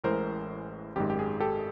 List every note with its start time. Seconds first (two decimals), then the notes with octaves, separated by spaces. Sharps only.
0.04 A1 A2 E3 G#3 A#4 C5
0.96 G#1 F#2 D#3 G#3 G4
1.10 G4
1.19 G#4
1.40 G4 A4